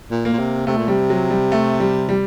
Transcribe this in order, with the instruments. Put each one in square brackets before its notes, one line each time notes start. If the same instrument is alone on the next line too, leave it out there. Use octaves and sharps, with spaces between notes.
[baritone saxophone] A#2
[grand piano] A#3
[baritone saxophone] A#2
C3
[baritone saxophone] C3 [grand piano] A3
[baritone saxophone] A#2
[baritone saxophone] C3 [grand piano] G3
[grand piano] F#3
G3
A3
G3
G3